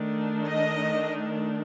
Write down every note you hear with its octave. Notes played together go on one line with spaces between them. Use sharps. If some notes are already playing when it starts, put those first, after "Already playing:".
Already playing: D#3 A3 D4
D#5